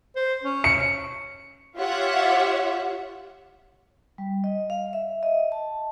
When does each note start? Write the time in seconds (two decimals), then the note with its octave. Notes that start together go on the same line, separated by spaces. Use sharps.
0.16 C5
0.43 C#4
0.64 C#7
1.76 F4 G4 C#5 E5 F#5
4.18 G3
4.44 D#5
4.70 F5
4.93 E5
5.23 D#5
5.52 A5